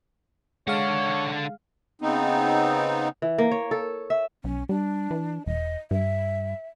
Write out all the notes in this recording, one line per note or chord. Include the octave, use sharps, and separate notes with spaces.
D3 G#3 C#5 F5 F#5
C#3 B3 C4 D#4
E3
A#3
C#5
A4
E5
B1 C#4
G3 D4
E3
E1 D#5
G2 E5